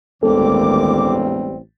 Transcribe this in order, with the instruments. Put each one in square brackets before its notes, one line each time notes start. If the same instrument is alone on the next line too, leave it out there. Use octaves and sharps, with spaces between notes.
[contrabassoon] E1 [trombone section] A1 G3 C4 [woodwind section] D2 D#3 D6 [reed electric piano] A4